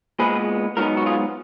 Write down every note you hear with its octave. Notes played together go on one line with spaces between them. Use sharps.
A#2 G#3 B3 G#4 B4
G#2 F#3 B3 D#4 F#4 A#4
F#4
F4 G#4